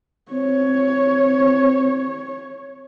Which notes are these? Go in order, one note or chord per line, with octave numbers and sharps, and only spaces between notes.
C4 C#5